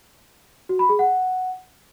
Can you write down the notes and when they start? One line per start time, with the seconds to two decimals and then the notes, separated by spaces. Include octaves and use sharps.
0.69 F#4
0.79 B5
0.89 G#4
0.99 F#5